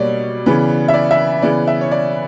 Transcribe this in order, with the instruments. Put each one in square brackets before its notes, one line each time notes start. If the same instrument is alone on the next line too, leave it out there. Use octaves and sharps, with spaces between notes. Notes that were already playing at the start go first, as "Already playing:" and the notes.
Already playing: [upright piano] B2 G3 A#3 C#5 D5
C#3 E3 B3
E5
D5
E5
C#3 E3 B3 D5
E5
C#5
D5